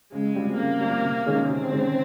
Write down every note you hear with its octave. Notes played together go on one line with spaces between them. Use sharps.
C#3 G#3
G3 C4 F4
C#3 A#3
G3 C4 F4
C3
D#3 G#3 C#4 G#4
C3 C4
D#3 G#3 C#4 G#4